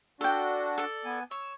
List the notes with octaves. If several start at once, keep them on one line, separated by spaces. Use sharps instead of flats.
D4 F#4 A4 G5
A4 D5
B3 G#5
C#5 E6